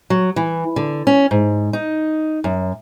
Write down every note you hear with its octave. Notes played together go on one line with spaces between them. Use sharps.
F#3
E3
D3
C#4
G#2
D#4
F#2